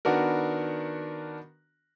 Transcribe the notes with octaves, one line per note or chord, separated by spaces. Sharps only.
D#3 B3 D4 F#4 A#4